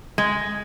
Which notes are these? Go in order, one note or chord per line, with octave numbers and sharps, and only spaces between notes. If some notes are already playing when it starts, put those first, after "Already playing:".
G#3